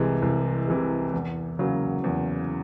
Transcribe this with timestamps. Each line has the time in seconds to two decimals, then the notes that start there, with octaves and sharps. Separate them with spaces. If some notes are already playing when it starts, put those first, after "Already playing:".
Already playing: C2 C3 E3 G#3
0.22 C2
0.67 C3 E3 G#3
1.13 E2
1.59 C#3 F#3 A#3
2.04 E2